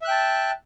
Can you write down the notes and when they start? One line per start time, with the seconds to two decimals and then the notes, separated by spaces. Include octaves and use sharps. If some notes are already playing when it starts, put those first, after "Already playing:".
0.02 E5
0.05 F#6
0.08 G5
0.11 A5